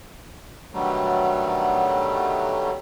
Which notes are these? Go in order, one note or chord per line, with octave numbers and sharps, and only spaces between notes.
B2 D3 D#3 F#3 G3 A3